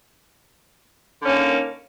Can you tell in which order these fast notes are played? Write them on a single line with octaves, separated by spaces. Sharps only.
D3 C#4 A#3 D#3